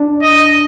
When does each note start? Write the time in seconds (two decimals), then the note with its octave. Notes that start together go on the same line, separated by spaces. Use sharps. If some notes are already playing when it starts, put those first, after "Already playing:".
Already playing: D4
0.22 D#5